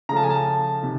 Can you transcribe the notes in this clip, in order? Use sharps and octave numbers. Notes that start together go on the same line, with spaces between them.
C#3 F3 A3 A#5
A5
G#5
A5
C3 D#3